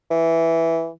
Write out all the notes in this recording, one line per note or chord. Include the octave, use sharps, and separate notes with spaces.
E3